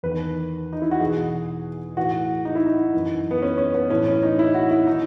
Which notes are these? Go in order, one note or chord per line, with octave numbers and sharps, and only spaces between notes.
E2 D#3 B4
D#4
E4
F#4
E2 B2 G#4
A2 E3 F#4
D#4
E4
D#4
F#2 E3
B3
C#4
C#4
B3
A2 E3 C#4
C#4
D#4
E4
F#4
E4
D#3 D#4